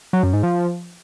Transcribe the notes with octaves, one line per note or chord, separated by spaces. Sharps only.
F#3
F#2
G#2
F3